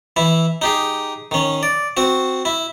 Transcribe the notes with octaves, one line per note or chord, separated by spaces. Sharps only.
E3 E4
D#4 G4 G#4
D#3 C#4
D5
C4 F#4
E4